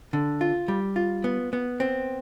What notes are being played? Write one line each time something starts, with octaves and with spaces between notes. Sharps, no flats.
D3
F4
G3
F4
B3
B3
C4